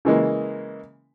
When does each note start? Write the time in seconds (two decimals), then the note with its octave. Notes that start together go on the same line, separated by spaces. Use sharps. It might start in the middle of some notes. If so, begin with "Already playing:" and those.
0.05 C#3 E3 G#3 A#3